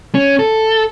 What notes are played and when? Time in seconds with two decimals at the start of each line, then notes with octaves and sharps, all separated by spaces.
0.15 C#4
0.39 A4